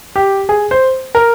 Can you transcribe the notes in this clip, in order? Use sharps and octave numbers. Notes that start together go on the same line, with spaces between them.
G4
G#4
C5
A#4